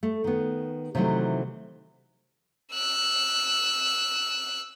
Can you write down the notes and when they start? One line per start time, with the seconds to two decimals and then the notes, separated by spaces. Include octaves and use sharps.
0.03 A3
0.24 D#3 B3
0.95 C3 D#3 E3 F#3 A3
2.73 E6 F#6